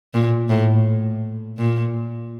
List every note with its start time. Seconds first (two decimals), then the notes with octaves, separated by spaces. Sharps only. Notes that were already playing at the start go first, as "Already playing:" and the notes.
0.14 A#2
0.49 A2
1.58 A#2